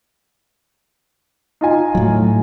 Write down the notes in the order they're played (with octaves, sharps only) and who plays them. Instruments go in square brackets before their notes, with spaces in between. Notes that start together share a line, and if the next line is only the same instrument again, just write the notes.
[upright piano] D#4 F4 G#5
[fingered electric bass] A2 F#3